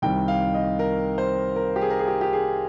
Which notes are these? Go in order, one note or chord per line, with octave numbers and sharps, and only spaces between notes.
C2 C3 D#3 G3 G5
F5
D#5
A#4
C5
A#4
G4
G#4
A#4
G#4
G4
G4
G#4